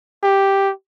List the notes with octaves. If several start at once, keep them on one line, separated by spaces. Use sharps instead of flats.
G4